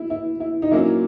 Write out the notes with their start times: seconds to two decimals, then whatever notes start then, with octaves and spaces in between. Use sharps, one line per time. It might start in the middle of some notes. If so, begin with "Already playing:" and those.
Already playing: E4
0.10 E4
0.40 E4
0.62 D#4
0.71 A#2 F#3 A#3 C#4 E4